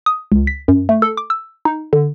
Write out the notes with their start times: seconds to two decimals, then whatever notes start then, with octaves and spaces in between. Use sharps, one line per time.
0.06 D#6
0.32 C#2
0.47 B6
0.68 F#2
0.89 A3
1.02 A4
1.17 D6
1.30 E6
1.65 D#4
1.93 D3